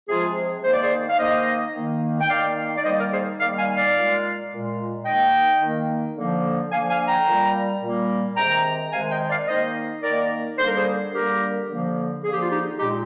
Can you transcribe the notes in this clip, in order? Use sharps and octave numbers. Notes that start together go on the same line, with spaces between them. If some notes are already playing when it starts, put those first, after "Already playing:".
C3 F3 G#3 F4 G#4
D#3 A#3 C5
D5
G#4 C5
F5
D#3 A#3 C5 D#5
D#3 A#3
G5
D#3 A#3 D5 F5
D5
D#3 G3 A#3 C5 D#5
A#4 D5
G#4 C5
D#3 G3 A#3 D5 F5
F5 G#5
D5 F5
A#2 G#3
A#2 G#3
D#3 A#3 D#5 G5
D#3 A#3
D3 F3 A#3
D3 F3 A#3 F5 G#5
F5 G#5
G5 A#5
A#2 G3 A#3
A#2 G3 A#3
C3 D#3 G#3 G5 A#5
C3 D#3 G#3 F5 G#5
D#5 G5
D5 F5
D#3 A#3 C5 D#5
D#3 A#3 A#4 D5
D3 G3 A#3 C5
A#4
G#4 C5
D3 G3 A#3 G4 A#4
D3 F3 A#3
D3 F3 A#3 G#4
G4
F4
D#4 G4
A#2 G#3 D#4 G4